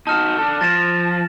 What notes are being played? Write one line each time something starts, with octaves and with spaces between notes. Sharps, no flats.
D#4 F#4 A5 F6 E7
D4 A4
F3 A6 A#6 E7